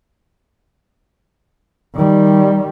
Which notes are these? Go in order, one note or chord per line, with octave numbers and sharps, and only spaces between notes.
D#3 G3